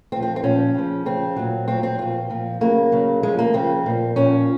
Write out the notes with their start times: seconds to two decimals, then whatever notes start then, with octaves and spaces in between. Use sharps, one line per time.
0.12 A#2 F3 C4
0.23 C4
0.36 C4
0.43 A#2 F3 C#4
0.74 C#3 F3
1.06 C#3 F3 C4
1.36 A#2 F#3
1.68 A#2 F#3 C4
1.83 C4
1.99 A#2 F3 C4
2.30 A#2 F3
2.61 C#3 F#3 A#3
2.92 C#3 F#3
3.23 C#3 F3 G#3
3.39 A#3
3.54 C#3 F3 C4
3.86 A#2 F3
4.16 A#2 F3 C#4